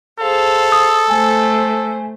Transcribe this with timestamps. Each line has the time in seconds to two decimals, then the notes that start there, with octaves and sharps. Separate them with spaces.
0.20 G#4 A4 C5 F5
0.72 D#6
1.10 A3 C5 G#5